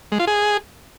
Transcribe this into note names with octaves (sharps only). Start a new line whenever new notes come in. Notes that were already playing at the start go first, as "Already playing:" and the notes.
G#3
F4
G#4